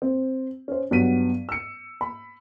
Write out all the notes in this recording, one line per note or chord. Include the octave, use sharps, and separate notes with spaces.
C4
C#4 C5
G2 F#3 B3 B6 D#7
E6 C#7
B5